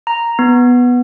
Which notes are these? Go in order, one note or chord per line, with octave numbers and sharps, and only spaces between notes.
A#5
B3